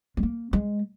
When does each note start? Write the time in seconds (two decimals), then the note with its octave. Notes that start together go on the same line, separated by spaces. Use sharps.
0.17 G#3
0.23 A#3
0.53 G#3